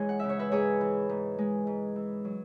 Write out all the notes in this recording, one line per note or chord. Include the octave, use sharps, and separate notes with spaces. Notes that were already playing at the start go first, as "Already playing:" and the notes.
Already playing: F#2 E3 G#3 G#4 B4 C#5
F#5
C#3 E5
C#5
B4 E5
G#2 G#4 C#5
E3
G#2
G#3
G#2
E3
F#3